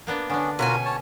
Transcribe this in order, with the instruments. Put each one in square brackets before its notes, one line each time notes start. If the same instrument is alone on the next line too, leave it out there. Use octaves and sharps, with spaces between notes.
[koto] A#3 B3 D4
[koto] D3 D4 [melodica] B3 C#4
[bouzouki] B2 C#4 G#5 [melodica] F4 F#4 A#4
[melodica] C#5 A5